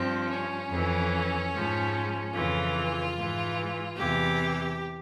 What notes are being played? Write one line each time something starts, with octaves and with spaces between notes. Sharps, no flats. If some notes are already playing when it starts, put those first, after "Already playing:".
Already playing: G2 F3 C4
C#4
F2 E3
G#2 F3
F2 C#3 E3 F4
G#2 E3
E2 C3 E3 G4